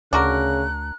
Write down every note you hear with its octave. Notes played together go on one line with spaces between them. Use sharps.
D2 C#3 D4 F#4 A#4 F#6